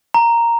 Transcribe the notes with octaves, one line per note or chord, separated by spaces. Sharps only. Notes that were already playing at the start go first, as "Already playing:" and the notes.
A#5